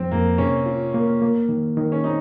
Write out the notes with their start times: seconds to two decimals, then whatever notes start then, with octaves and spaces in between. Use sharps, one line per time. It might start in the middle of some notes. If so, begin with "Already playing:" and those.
Already playing: F2 F3 C4
0.11 F2 A#3
0.38 C3 C#4
0.66 F4
0.94 A#3
1.21 A#3
1.49 D#3
1.77 D#3
1.92 C#4
2.04 C4 D#4